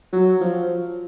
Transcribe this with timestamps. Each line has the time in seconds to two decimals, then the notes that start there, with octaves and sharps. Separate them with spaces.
0.13 F#3
0.41 F3